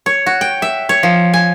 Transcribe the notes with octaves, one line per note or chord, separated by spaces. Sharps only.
C#5
F#4
G5
E5
C#5
F3
G#5